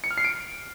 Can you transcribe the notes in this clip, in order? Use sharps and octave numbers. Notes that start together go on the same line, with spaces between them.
C#7
F6
C7
D7